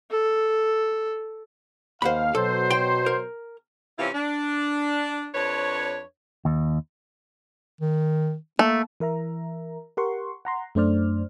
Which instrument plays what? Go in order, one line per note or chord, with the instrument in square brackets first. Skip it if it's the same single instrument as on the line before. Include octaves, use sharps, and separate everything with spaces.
[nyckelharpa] A4
[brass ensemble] D#2 F5 [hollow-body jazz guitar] C5 F#5 B5
[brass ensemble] B2 F#3 C5 [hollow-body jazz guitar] A4
[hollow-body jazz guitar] G5 C6
A#4
[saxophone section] C3 E3 C4 C#4 E4 F4
D4
F2 D4 B4 C#5
[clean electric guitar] D#2
[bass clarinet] D#3
[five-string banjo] A3 [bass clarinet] A#3
[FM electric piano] E3 A#4 E5 A#5
G4 A#4 F#5 C6 C#6
F#5 A#5 C6
F#2 A3 D4 C5 D5 F6